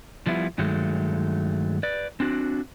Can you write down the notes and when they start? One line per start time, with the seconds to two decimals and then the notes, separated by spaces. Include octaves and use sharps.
0.26 F3 G3 B3 E4
0.58 G2 D#3 F#3 G#3 A3
1.83 B4 D5
2.20 C4 D4 F#4